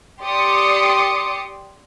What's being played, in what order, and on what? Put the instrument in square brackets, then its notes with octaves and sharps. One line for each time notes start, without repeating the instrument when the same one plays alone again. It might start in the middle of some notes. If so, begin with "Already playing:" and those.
[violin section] G4 D5 C6 D6 D#6 C#7